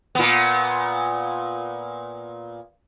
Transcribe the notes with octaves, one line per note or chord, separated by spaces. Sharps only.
A#2 B3